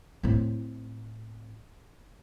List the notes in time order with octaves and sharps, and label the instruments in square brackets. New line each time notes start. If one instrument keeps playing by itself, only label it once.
[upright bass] A2 C4